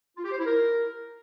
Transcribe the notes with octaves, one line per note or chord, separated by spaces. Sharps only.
F4
G4
C5
E4
A#4